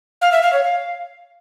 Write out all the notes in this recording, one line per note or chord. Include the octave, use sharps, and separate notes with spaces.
F5
E5
F5
C#5
F5